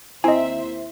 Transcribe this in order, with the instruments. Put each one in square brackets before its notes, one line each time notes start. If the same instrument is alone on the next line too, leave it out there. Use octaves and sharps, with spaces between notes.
[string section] D#2 C5 E5 [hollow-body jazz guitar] C4 [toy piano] E4 [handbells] D#5 G#5